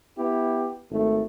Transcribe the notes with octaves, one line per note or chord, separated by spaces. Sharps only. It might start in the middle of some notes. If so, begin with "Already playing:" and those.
B3 E4 G4
G#1 A3